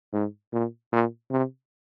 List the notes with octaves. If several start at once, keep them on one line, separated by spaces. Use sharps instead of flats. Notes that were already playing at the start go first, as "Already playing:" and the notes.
G#2
A#2
A#2
C3